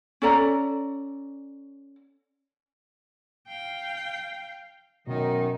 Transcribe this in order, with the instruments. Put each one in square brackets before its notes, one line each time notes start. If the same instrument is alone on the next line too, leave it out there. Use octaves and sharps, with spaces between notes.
[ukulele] C#4 A4 D5 A#5
[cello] F5 G5
[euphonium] F#2 [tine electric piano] B2 [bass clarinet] D#3 [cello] D#4